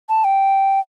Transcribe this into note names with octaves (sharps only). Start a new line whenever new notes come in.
A5
G5